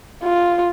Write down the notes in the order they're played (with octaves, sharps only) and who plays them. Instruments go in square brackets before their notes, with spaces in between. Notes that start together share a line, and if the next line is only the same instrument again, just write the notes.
[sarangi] F4